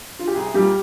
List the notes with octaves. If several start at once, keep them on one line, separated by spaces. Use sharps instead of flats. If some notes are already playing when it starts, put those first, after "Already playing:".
F4
G4
C2 G#4
A#2 G3 A#3 G4